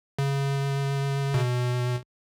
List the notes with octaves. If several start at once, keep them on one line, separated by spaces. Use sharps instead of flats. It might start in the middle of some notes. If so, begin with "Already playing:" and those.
C#3
B2